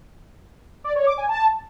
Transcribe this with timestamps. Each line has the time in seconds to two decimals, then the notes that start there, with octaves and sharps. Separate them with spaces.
0.84 D5
0.96 C#5
1.07 D6
1.18 G#5
1.29 A5